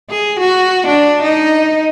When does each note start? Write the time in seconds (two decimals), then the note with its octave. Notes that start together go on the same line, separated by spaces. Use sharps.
0.10 G#4
0.40 F#4
0.87 D4
1.22 D#4